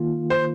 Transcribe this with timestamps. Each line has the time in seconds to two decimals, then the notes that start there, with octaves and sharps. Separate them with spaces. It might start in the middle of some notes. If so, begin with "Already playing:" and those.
Already playing: D#3 A#3 F4
0.30 C5